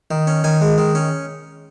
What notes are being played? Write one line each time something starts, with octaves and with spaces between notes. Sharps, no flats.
D#3
C#4
D#3 G#5
G#3
D#3
C#4